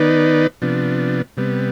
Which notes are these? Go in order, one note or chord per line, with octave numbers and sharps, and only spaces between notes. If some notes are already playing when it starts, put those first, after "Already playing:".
Already playing: D#3 B3 D#4 B4 D5
C3 F3 B3 D4
C3 G3 B3